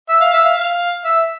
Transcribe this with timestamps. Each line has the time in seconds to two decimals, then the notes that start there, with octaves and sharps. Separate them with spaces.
0.09 E5
0.21 F5
0.33 E5
0.45 F5
0.57 F5
1.05 E5